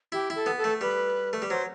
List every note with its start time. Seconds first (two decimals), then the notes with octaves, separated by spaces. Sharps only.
0.12 E4 G4
0.30 E4
0.35 A4
0.46 B3
0.58 A4
0.64 A3
0.81 G3 B4
1.33 A3
1.42 G3
1.50 F#3 C5